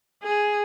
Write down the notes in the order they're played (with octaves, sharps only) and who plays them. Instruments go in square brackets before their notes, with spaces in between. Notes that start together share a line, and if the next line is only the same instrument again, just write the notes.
[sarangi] G#4